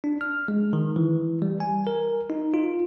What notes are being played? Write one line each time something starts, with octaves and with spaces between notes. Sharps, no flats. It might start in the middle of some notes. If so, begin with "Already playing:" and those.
D4
F6
G#3
D#3
E3
G3
G#5
A#4
D#4
F4